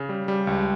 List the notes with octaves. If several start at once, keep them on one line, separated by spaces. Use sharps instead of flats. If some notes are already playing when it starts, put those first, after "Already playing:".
Already playing: C#3
G3
G3
C#2